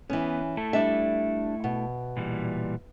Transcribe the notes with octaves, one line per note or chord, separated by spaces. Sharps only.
E3 B3 C#4
A3 E4 A4
G3 D4 E5
B2
A#2 E3 G3